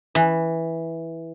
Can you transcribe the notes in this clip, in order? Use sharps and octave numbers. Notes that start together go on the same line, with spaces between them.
E3